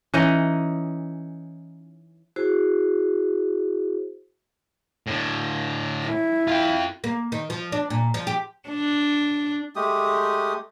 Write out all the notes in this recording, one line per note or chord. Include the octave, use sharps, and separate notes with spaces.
E3 C#4 D#4 D#5
E4 F#4 G#4 C5
A2 D3
E4
F4 G5
A#3
D#3
F3
D4
A#2
F3
G4
D4
G#3 A3 G4 D#6